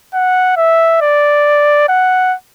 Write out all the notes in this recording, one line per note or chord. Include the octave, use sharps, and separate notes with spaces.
F#5
E5
D5
F#5